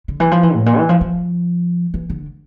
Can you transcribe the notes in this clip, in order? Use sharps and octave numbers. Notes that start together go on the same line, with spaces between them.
D3
E3
F3
E3
A2
A#2
E3
F3
F3
E3
D3